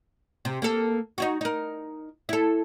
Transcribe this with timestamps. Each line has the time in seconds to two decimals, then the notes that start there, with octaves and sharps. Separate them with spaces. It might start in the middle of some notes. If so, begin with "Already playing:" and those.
0.45 C3
0.62 A#3 A4
1.18 D#4 E4 F#4
1.41 D#4 A#4
2.29 E4 A4